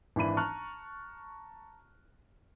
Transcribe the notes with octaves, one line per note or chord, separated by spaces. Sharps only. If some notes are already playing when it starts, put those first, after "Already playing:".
G#1 E3 D4 E4 B5 D#7
A5 A#5 C#6 F6 F#6